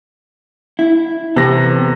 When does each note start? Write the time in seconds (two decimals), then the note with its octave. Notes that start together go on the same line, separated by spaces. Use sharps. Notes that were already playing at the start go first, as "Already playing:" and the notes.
0.79 E4
1.36 E2 C3 B3 A4 A#6